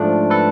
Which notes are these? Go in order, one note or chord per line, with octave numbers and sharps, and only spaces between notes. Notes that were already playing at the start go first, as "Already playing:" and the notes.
Already playing: G#2 F3 A3 D4
A4 B4